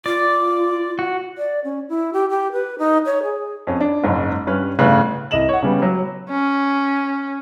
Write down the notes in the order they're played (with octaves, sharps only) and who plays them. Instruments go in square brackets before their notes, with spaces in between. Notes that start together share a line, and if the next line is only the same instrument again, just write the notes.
[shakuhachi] F4 [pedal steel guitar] D5
[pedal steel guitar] F#4
[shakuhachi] D5
C#4
E4
G4
G4
B4
D#4
C#5
G#4
[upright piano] F2 C#4
D4
F#1 G#2 C#4
G2 C#4 B4 F6
G1 A2 C#3 B4 F#6
[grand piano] C2 D#5 E7 F#7
C#5 F#5
C#3 G3 B3 C#4
F#3
[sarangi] C#4